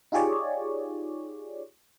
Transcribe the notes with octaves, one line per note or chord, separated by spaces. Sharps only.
D#4 F4 G4 G#4 C#5 D5